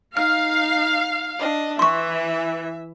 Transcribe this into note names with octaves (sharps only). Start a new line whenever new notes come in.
D#4 F5 F6
D4 D#5
E3 E5 C6 C#6